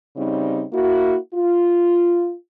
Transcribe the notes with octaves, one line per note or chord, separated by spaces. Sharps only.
C#3 G3 C4 D#4
A#3 E4 F#4
F4